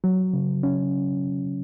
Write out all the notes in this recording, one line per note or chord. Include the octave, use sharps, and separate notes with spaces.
F#3
C#3
C#4